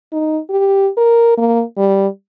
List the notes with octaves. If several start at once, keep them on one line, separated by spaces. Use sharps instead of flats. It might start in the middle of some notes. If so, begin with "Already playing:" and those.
D#4
G4
A#4
A#3
G3